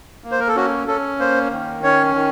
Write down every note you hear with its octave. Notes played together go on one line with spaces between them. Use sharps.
A#3
C5
A#4
A4
C#4 F#4
C#4 A4
A#3 C5
D#3
C#4 C#5
D#3